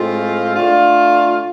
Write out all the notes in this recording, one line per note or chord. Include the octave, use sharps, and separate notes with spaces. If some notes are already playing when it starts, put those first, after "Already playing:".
Already playing: A2 G#3 C4 F4
D3 A3 D4 F4